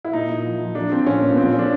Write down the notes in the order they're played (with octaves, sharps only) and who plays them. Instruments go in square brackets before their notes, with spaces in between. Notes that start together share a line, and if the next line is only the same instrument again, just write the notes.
[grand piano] E4
A#2 D#4
A#2
F3
F3
F3 D4
F3 C4
A#2 C#4
A#2
B3
F3 C4
C#4
F3
D4